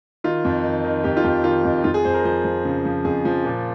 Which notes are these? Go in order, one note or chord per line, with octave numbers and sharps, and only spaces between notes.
D#3 F4
F2
D#3
D#3
F2 G4
F4
F2 G4
D#3 F4
F2 D#4
F2 F4
G#4
F2 C5
A#4
F3 C5
F3
C#3
F3
F2 G#4
F3
A#2